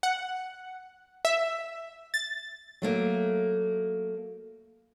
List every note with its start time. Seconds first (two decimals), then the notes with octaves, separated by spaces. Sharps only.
0.03 F#5
1.25 E5
2.14 A6
2.82 F#3 A3 A#3